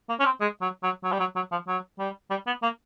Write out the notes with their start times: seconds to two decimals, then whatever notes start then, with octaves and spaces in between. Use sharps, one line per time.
0.09 A#3
0.20 C#4
0.25 C4
0.41 G#3
0.61 F#3
0.83 F#3
1.04 F#3
1.12 G3
1.20 F#3
1.36 F#3
1.52 F3
1.68 F#3
1.99 G3
2.30 G3
2.47 B3
2.63 A#3